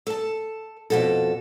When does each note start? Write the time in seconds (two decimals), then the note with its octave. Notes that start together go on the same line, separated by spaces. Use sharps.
0.07 A4 A5
0.90 F2 B2 A4